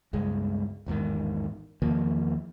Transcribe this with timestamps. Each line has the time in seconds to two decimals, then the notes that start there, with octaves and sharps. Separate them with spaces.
0.13 C#2 G2 G#3
0.86 A1 E2 G#2 D#3
1.82 E2 D#3 F3 A#3